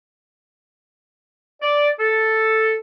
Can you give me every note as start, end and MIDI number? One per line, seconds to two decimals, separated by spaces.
1.62 1.89 74
1.99 2.75 69